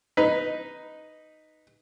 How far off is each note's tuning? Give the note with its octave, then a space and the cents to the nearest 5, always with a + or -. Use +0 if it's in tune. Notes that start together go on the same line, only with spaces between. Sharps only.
D#4 +0 B4 +0